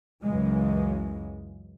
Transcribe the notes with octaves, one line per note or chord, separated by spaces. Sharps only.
C#2 F#2 C#3 E3 G#3